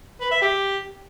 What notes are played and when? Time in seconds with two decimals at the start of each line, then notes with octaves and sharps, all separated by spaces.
0.21 B4
0.31 E5
0.42 G4